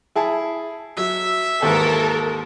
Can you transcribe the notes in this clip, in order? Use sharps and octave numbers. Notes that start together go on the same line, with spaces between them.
E4 G#4 A5
F#3 E5
D#2 G#2 E3 A4 A#4